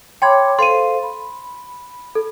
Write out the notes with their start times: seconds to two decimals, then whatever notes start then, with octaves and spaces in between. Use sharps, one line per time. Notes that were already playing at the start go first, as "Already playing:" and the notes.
0.22 C#5 G5 B5 C6 D6 G#6
0.59 A4 C5 F5 C6 D#7
1.03 B5
2.15 A4